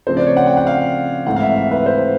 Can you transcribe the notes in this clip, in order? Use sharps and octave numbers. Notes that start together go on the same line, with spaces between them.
C#3 F3 A3 C4 C5
D5
C#5
F#5
G5
F#5
F5
G#2 E3 A3 C4 F#5
F5
E5
E5
B4
C5